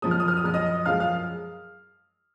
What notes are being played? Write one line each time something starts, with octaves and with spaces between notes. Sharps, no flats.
F#2 F3 G#3 D#6
F6
D#6
F6
D#6
F#2 F3 G#3 F6
D#5 D#6
F#2 F3 G#3 F5 F6
F5 F6